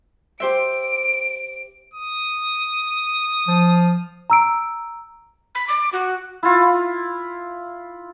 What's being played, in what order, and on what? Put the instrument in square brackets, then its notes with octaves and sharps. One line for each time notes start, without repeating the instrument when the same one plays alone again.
[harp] G4 C5 E5 [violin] D7
[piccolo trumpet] D#6
[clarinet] F3
[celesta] A#5 E6 D7
[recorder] B5
D6
F#4
[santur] E4 F4